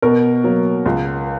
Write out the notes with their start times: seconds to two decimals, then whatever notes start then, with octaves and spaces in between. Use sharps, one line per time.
0.02 B2 A#4
0.44 F#3 A#3
0.86 C#2